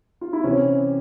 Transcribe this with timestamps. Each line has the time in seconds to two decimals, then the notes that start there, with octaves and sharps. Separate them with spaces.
0.21 F4
0.33 E4
0.44 C3 E3 C#4